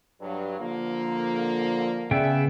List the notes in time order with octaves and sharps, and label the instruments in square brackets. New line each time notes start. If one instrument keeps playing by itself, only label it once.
[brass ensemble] G2 F#3
D3 F3 A#3
[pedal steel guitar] C#3 B3 G5 [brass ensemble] G#4 D5 E5